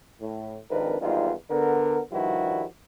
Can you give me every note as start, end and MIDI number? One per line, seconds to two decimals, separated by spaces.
0.21 0.57 45
0.70 0.95 32
0.70 0.95 41
0.70 0.95 51
0.70 0.95 62
0.70 0.95 70
0.70 0.95 71
1.01 1.32 32
1.01 1.32 40
1.01 1.32 55
1.01 1.32 63
1.01 1.32 65
1.50 1.99 50
1.50 1.99 59
1.50 1.99 70
2.12 2.65 43
2.12 2.65 51
2.12 2.65 53
2.12 2.65 55
2.12 2.65 64
2.12 2.65 66